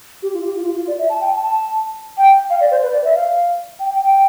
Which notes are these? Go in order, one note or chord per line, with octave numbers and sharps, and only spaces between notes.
G4
F4
G4
F4
F4
F4
D5
E5
A5
G5
A5
A5
G5
F5
D5
C5
B4
D5
E5
F5
G5
G5
G5